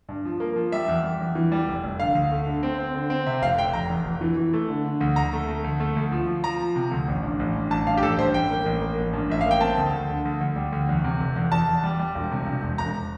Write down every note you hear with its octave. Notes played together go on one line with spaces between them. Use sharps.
G2
F3
A#3
F3
G3 E5
E2
G3
E2
E3
G3
F1
F1
D3 F5
D2
A3
D3
C4
C4
D3
C4
C3 E5
F1 F5
F1 G5
F1 A#5
E2
F1
E3
E3
A3
D3
D3
D2
D2 A#5
A3
A3
D2
A3
D2
F3
F3
F3 A#5
F3
C3
D2
A1
G2
A1
G2
A1 A5
G2 F5
G4
A1 A4
G2 C5
A1 G5
A#3
A1
A#3
A1
G2
A1 E5
F5
A#3 G5
C4 A5
D2
D2
D3
D2
D2
G3
D2
E2
C3
F1
E2
E2 A5
E2
G3
G3
E1
C3
E1
E1
E1 A#5